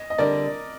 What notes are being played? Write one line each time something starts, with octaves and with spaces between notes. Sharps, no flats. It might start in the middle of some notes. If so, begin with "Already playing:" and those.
Already playing: D#5
D#5
D3 G3 A#4 D5